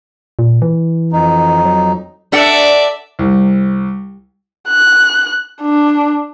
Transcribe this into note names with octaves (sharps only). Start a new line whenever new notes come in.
A#2
E3
F2 D#4
F#3
D4 A4 D5 E5 F#5
C2
F#6
D4